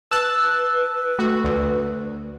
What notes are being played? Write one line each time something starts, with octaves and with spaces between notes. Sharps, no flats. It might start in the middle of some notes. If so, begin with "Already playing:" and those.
B4 A5 E6 F#6
A3 F#4
D2